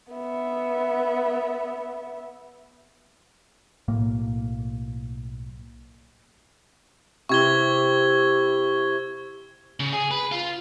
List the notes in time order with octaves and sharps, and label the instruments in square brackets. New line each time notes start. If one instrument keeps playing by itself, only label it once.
[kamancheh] B3 E5
[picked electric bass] B1 A2 A#3
[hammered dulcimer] C3 E4 [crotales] C#6 G#6 G7
[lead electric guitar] C#3
G#4
B4
F4